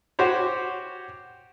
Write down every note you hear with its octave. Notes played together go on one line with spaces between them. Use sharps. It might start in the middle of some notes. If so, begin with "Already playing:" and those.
F#4 G4 C5 C#5